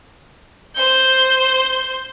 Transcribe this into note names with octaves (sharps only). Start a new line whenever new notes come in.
C5 G6